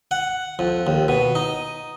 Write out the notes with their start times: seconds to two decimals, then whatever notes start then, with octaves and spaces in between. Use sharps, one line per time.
0.11 F#5
0.59 F2
0.87 D#2
1.08 B2
1.35 D#4